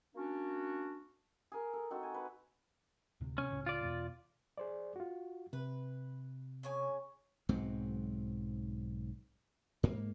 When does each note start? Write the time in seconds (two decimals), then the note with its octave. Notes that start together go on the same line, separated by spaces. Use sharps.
0.16 A#3 C#4 D4 F#4
1.52 G#4 A#4
1.73 A4
1.91 C4 D#4 F#4 A4
2.03 G#5
2.14 B4
3.21 D2 A2 C3
3.38 C3 C#4
3.50 C#2 A2 C#3
3.66 F4 D5
3.83 E2 B2
4.58 G#4 C5 D5
4.96 F4 F#4
5.53 C3 B4
6.63 C#3 C#4 G#5
7.49 B1 G#2 F#3 C4
9.83 G#2 A#3